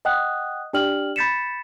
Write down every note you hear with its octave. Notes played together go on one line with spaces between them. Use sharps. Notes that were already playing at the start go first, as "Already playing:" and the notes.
D#5 F#5 G5 D#6 F#6
D4 G4 D5 G5 F6 F#7
B5 G6 A6 B6 C#7 E7